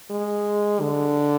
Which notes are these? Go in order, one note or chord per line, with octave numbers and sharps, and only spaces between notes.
G#3
D3